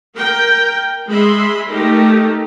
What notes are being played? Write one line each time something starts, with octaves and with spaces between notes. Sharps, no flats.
A#4 G5
G#3 G#4 E5 B5 C6
A3 D#4 G4 A4 A#4